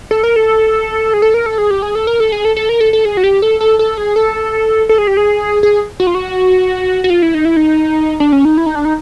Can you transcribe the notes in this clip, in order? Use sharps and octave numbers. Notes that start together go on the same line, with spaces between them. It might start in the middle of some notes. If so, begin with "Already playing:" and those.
A4
A#4
A4
G#4
A4
A#4
A4
G#4
G4
G#4
A4
A#4
A4
G#4
A4
A4
A#4
A4
A4
G#4
F#4
G4
A4
A4
A4
G#4
A4
A4
G#4
G4
G#4
G#4
F#4
F4
F#4
F#4
F4
E4
D#4
E4
D#4
D4
C#4
D#4
E4
D#4
D4
D#4